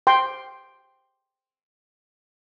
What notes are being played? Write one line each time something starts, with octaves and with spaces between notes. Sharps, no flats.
G5 C6